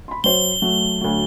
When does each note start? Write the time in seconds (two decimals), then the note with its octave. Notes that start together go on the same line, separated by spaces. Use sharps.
0.08 B5 C6
0.24 F#3 C5 C#5 G7
0.62 F#3 A3
1.01 D2 F#3